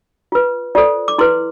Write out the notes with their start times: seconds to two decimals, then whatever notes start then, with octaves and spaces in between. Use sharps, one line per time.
0.32 F4 B4
0.75 F4 A4 C5 D5
1.08 D6
1.18 E4 B4 C6